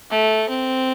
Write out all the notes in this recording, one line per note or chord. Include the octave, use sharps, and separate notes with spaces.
A3
C4